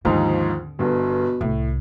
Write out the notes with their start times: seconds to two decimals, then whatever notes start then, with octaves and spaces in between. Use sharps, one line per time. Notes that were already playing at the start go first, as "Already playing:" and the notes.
0.05 D#2 G#2 D3 F3 C4 D#4
0.79 G1 G2 B2
1.41 C2 A2